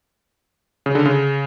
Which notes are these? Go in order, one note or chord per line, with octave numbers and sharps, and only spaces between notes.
C#3
D3
C#3